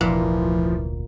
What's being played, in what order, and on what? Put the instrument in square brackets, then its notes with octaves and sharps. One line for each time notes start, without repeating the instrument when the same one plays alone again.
[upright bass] F1 D2 [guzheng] A#2 [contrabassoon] E3 [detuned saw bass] F3